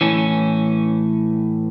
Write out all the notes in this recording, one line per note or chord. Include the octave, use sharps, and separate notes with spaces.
A2 E3 C#4